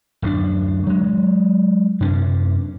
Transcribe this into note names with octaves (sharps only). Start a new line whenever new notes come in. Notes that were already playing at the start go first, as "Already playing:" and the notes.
D1 F#2 D4
F#3 G#3
F#2 C3 C#4 D4